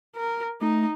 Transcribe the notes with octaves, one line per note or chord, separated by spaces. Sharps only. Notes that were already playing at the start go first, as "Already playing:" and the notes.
A#4
A3 D#4